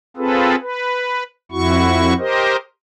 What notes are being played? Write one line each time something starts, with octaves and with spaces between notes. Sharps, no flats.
C4 F4 G#4 A4 B4
B4
F2 E4 F#4 C#6
G4 A#4 C5 D#5